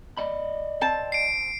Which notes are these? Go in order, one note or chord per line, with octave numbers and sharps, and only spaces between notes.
D5 D#5 B5
C4 A5
C7 D7